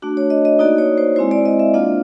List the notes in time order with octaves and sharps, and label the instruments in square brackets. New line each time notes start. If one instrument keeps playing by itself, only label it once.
[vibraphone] A3 D4 F#4
C#5
D#5
D#5
A#3 D#4 F#4 D5
C#5
C5
G#3 C4 E4 C5
D5
D#5
E5
A#3 D4 F4 F5